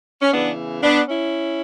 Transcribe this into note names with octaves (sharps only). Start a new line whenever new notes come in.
C#4
E2 C#3 E3 B3 D4
B3 D4
C#4 E4